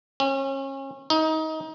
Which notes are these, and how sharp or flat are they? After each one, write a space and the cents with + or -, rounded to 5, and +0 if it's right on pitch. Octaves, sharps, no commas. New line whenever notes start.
C#4 -30
D#4 +25